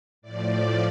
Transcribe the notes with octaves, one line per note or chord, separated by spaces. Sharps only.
A2 F3 D5